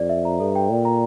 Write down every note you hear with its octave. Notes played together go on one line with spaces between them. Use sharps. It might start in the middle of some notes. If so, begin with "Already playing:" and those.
Already playing: F2 D5
E5
A#5
G2 A4
G5
A#2 D5
A#5